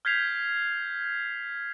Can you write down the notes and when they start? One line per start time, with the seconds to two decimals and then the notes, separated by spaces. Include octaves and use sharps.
0.05 F6 G6 G#6 B6 C7 F7